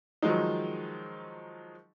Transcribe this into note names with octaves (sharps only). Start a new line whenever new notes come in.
D#3 F3 F#3 G#3 D#4